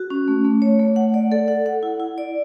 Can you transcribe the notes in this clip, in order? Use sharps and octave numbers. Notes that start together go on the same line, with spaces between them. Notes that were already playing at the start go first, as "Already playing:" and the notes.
Already playing: F#4
C#4
A3
A3
C#5
A3
F#5
D5
A4
F#5
F#5
E4
E4
D5